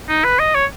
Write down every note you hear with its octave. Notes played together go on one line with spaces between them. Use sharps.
D#4
B4
D#5
C#5